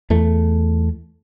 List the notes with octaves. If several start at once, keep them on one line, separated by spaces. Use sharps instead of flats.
E2 A3